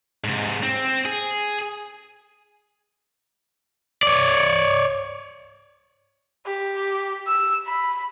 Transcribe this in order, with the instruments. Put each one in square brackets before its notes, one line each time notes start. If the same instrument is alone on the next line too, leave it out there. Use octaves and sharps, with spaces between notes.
[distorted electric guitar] G#2 C3
C4
G#4
[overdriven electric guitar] C#5 D5
[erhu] G4
E6
B5